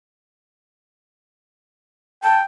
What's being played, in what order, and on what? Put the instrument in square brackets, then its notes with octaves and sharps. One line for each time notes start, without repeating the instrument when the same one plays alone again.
[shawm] G5 [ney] A5